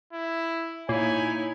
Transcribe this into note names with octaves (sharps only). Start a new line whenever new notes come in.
E4
A#2 D#4 E4 C#5 G#5